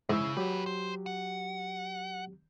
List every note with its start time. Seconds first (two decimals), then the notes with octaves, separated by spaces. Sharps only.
0.10 G#2 C#3 E4 E6
0.37 F#3 G4 G#4 B4
0.66 C5
1.06 F#5